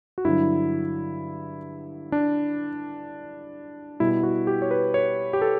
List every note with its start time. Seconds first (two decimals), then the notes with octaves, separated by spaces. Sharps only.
0.18 F#4
0.25 G2 D3 F#3 E4
2.12 D4
4.00 B2 G3 E4
4.23 F#4
4.47 G4
4.62 C#5
4.71 B4
4.94 C#5
5.33 G4
5.42 A4